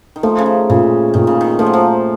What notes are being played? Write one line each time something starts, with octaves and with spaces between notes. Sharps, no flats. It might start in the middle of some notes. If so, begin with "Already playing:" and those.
D#3
F3 A3
C#3
D#3
A#2 C#3
A#2 D#3
C#3
D#3
F3 A3
F#3
F3